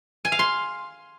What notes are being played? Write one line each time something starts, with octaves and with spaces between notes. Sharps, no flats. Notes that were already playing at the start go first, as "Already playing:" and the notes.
G#5
F5
C6